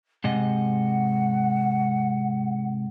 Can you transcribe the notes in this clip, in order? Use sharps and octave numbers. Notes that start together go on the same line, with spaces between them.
G#2 C3 D#5 F#5